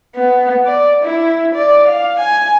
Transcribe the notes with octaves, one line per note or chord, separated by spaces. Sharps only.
B3
D5
E4
D5
F5
G#5